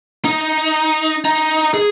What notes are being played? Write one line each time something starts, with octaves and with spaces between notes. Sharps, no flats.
D#4
D#4
G#4